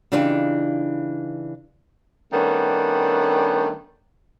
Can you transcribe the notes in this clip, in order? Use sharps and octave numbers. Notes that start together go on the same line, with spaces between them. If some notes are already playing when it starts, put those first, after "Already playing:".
C#3 E3 D4 D#4 F4 G4
D#3 G3 A3 B3 C#4 D4